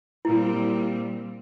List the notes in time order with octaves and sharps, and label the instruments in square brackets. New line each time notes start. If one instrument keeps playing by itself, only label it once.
[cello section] A#2 G3 C4 [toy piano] E4